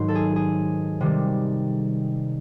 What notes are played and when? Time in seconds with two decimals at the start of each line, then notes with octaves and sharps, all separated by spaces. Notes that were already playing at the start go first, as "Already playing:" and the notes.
Already playing: G#2 D#3 F#3 C5
0.08 A4
0.15 G#4
0.36 G#4
1.01 C3 D#3 G3